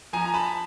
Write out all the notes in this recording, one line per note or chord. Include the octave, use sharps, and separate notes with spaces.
F3 G#5 A#5
A#5
A5 B5